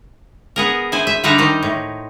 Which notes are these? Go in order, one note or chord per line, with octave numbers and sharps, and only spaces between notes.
B3 G#4 A#4
E4 C5 G#5
E5
D3 G3 D4 D#4 E5 A#5
D#3 D#4 C5
A2